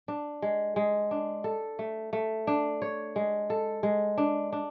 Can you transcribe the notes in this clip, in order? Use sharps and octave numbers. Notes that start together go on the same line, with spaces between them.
D4
G#3
G#3
D4
A4
A3
A3
D4
C#5
G#3
A4
G#3
D4
D4